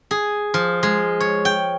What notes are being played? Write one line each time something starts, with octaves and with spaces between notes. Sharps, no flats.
G#4
F3
G#3
C#5
G5